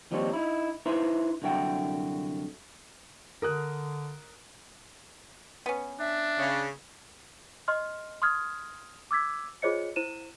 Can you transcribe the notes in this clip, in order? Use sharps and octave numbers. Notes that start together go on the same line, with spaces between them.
D#2 F3 G3 C4 D#4 C#5
D#4 E4
D#4 E4 B4 C5 E5 A#5
C2 F#2 D3 F#4 E5 G5
D3 A#4 D#6 F#6
B3 C#4
D4 E5
C#3
D#5 C6 F6
C6 D#6 F6 G#6
D6 E6 G#6 B6
F4 G#4 C5 C#5 D#5 C#7
E4 C5 D#7 E7